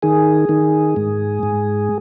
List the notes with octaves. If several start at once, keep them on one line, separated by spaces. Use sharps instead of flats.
D#3 G#4
D#3
G#2
G#2